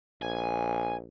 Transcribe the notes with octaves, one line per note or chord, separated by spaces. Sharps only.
A#1 G#5